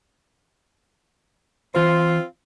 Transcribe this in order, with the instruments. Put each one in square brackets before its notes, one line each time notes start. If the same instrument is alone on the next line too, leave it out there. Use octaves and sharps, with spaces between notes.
[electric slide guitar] E3 C5 [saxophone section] C4 F4